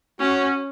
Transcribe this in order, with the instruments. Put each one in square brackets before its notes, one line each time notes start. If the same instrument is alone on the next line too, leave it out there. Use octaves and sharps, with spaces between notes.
[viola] C#4 [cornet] F#4